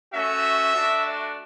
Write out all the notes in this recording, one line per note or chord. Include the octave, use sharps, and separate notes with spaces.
A3 C#4 F#4 E5
A3 D4 F#4
D5